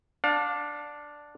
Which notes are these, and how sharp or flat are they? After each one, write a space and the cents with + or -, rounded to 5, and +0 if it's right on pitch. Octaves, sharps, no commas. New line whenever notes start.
D4 +0 F5 +35